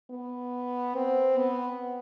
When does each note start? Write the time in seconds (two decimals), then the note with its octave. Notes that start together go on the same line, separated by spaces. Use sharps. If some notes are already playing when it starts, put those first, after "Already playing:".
0.10 B3
0.95 C4
1.38 B3